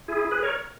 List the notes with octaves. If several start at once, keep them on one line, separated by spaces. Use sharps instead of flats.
E4 G#4
G#4 B4
A#4 C#5